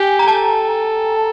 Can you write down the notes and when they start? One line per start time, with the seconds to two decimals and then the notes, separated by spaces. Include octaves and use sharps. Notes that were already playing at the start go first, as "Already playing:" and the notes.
Already playing: G4 G5 G#5
0.19 A#5
0.27 A4 A5